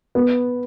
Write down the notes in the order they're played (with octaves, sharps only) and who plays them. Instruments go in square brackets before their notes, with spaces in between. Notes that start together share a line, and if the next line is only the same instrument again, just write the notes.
[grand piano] B3